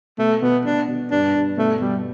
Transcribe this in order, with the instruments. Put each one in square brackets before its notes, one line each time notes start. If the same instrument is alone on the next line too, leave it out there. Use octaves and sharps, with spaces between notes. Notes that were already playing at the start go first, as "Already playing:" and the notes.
[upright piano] B2 [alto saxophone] A3
[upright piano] B2 [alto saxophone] B3
[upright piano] B2 [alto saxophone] D4
[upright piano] B2
[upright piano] G2 [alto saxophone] D4
[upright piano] G2
[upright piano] B2 [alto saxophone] A3
[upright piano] B2 [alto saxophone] G3